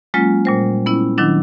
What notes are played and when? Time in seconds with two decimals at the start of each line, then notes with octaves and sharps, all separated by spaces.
0.14 F#3 G#3 A#3 C#4 F4
0.45 A#2 G3 C5
0.86 B3 C#4 E4
1.18 D#3 F#3 D4 E4